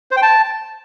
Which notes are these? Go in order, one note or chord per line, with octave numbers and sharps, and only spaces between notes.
C5
G5
A5